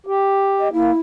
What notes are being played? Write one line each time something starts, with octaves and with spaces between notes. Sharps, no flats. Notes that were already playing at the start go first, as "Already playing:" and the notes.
G4
D#5
A#3 E4